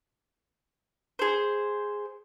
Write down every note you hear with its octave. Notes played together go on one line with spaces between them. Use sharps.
G#4 C5